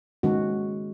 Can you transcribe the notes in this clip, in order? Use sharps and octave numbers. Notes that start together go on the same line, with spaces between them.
D#3 G#3 C#4 F#4